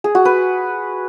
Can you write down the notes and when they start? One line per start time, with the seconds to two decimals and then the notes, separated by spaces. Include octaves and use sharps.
0.04 G#4
0.15 F#4
0.25 B4